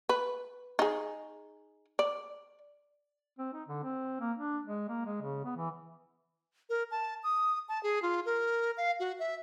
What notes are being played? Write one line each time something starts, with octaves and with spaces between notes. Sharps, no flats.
B4
D#4 G#4
D5
C4
D#4
D3
C4
A#3
D4
G#3
A#3
G#3
C#3
B3
E3
A#4
A5
D#6
A5
G#4
F4
A#4
F5
F#4
E5